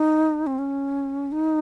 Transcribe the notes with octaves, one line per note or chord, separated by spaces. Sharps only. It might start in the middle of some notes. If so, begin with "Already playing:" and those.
Already playing: D#4
C4
C#4
D#4